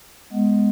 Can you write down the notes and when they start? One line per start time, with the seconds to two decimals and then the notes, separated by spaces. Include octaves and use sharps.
0.32 G#3 B3